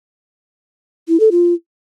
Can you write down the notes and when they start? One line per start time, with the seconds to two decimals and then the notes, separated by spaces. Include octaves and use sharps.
1.08 E4
1.20 A4
1.31 F4